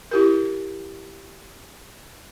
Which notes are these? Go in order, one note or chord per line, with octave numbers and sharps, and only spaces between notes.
E4 G4 A#4